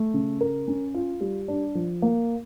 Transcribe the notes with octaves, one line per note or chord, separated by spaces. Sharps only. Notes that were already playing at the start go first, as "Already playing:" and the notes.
Already playing: A3
C#3
A#4
C#4
F4
G3
D4
F3
A#3